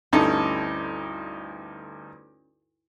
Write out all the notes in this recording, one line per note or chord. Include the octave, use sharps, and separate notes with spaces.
D2 G2 C#4 D#4 E4 A4